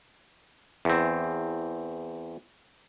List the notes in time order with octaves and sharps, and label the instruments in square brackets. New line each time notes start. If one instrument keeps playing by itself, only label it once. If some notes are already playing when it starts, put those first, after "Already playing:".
[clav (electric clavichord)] E2 C4